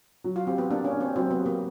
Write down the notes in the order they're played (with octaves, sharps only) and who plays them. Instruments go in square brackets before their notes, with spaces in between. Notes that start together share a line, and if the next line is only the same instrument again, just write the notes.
[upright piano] F#3
[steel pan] F4
[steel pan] C4 [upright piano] G4
[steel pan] B3
[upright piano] A#3 [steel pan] D4
[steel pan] C#4
[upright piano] D4
[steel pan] C4
[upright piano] F#3 [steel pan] C4
[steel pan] B3
[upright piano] G4
[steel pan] A#3